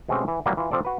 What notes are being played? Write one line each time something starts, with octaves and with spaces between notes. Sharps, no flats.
B2 G#3 A3 C4 C#4 G4
E3
E3 F#3 G3 A#3
E3 F4
F3 C4 A4 D5
F#4 B4